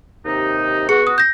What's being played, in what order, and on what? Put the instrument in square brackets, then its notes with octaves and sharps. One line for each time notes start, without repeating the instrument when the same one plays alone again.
[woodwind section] D#2 C3 D#4
[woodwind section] B3 F#4 [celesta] G#4 C#7
[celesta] D#6
G6 A#6